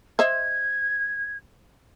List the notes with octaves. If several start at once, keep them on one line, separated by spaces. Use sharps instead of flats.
C5 D#5 E5 G#6